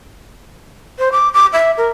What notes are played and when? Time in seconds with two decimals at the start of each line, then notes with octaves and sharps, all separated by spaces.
0.99 C5
1.12 D6
1.34 D6
1.53 E5
1.78 A#4